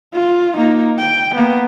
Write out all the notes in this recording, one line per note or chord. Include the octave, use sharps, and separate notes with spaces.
F4
A#3 D#4
G5
A#3 B3